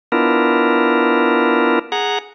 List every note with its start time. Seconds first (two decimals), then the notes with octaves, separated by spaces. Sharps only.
0.12 B3 D4 E4 F4 A#4
1.92 G#4 F#5 A#5